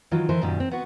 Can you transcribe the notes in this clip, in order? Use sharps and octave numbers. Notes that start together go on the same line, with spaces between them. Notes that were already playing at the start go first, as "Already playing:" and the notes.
D#3 E3 F#3 F4
D#3 E3 A4 A#4 C5
F#2 A#2 D#3 G3
C4
B3 F#4